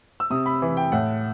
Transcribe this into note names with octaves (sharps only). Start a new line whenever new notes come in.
E6
C3 D#6
B5
E3
G5
A2 F#5